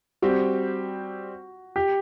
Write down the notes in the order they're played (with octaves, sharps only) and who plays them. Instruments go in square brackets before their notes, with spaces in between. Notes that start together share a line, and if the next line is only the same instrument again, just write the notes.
[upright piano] G3 C4 G4 [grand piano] F#4
[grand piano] G4